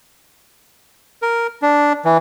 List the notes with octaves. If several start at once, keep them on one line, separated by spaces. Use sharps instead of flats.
A#4
D4
E3